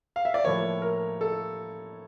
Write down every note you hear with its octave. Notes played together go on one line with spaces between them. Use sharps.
F5
E5
D5
A2 F3 A#3 C#5
A#4
A4